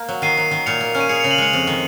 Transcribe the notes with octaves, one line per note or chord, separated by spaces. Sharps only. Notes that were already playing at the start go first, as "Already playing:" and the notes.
Already playing: A#3
F#3
D#3 C7 D#7
F#3
D#3
A#2 C#7 F7
A#3
C#4
D#7
G#4 C#7 F7
C#3 C#7 F7
D#7 F#7
G#3 C#7 F7
F2
D#3